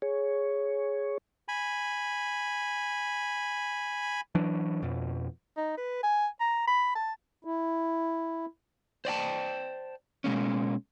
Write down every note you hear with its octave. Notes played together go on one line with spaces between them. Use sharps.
G#4 C#5
G#5 B5
E3 F#3 D4
F2 B2
D#4
B4
G#5
A#5
B5
A5
E4
C5 D5 G5 A5
B2 G#3 A#3 C#4